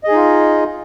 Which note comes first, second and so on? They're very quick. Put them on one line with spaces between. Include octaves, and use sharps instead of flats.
D#5 G#4 D#4 F4